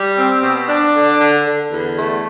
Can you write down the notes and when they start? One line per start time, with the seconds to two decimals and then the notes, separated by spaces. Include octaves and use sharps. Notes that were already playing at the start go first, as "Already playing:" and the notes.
Already playing: G3
0.17 C4
0.43 B2
0.68 D4
0.94 D3
1.20 D3
1.46 D3
1.70 E2
1.97 A3